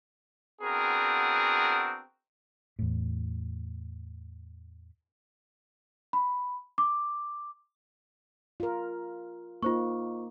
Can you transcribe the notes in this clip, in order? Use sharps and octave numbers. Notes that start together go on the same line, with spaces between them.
B3 C4 D4 F#4 G#4 A#4
E2 A2
B5
D6
F4 A#4
A#3 D#4 F4 C5 C#6